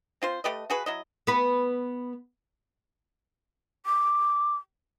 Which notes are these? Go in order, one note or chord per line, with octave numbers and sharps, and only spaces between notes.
C4 F4 C5
A3 G4 B4 D#5
F#4 G#4 B4
F#3 E4 D#5
B3 B4
D6